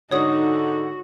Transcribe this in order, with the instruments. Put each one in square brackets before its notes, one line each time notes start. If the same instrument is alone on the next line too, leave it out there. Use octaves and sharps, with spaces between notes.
[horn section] G#2 D3 [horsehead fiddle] D#4 [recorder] F#4 [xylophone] C#5 D#6